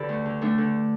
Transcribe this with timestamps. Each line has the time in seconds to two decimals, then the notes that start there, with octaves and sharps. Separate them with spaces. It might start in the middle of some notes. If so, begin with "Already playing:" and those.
Already playing: D3 G4 A4 B4 D5
0.09 D2
0.25 D3
0.41 D2 A3 D4
0.58 D3